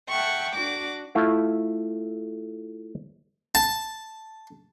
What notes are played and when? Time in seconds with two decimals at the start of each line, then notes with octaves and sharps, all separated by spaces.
0.10 E5 F#5 G5 A5 C#6
0.55 D4 F#4 D6 A#6
1.15 A3 E4 F4
3.55 A5